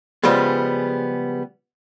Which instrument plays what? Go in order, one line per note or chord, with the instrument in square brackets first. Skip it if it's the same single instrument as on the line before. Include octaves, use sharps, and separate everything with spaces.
[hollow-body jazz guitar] C#3 F3 G3 G#3 B3